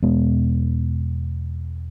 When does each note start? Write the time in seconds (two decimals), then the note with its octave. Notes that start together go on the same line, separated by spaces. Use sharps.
0.03 E2 B2 G#3 B3